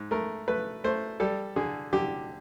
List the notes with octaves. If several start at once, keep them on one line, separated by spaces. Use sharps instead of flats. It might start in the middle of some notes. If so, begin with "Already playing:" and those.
Already playing: G#2
A3 A#4
A3 B4
A3 C5
G3 A4
D3 G#4
D3 G4